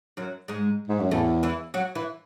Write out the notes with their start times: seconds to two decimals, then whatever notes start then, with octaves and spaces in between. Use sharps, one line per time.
0.17 F#2 F#3
0.48 G#2 G#3
0.88 G#2
1.00 F#2
1.11 E2 A2 A3
1.43 E3 E4
1.74 F#3 F#4
1.95 E3 E4